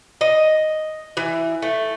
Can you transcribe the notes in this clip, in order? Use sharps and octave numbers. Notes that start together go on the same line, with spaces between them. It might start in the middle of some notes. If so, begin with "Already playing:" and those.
D#5
E3
A3